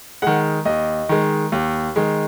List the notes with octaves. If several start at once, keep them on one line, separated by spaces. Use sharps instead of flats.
D#3 G#3 F#5
D#2 D#5
D#3 G#3
D#2
D#3 G#3